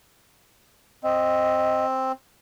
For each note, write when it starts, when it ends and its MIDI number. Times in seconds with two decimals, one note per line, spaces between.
1.03 2.12 60
1.03 1.85 75